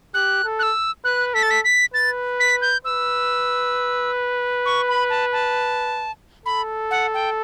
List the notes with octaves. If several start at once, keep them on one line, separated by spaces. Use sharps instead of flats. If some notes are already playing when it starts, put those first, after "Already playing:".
G4 F#6
A4
F#6
E6
B4 F#6
A4 B6
A6
B6
B6
B4 A6
B6
G6
B4 E6
C#6
B5
A5
A5
A4 B5
F#5
G5